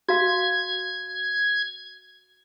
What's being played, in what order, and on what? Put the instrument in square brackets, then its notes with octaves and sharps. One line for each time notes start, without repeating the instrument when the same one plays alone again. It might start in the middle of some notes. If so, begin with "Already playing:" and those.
[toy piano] F#4 F5 [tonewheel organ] G#6